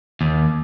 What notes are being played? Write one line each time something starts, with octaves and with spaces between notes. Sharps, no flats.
D#2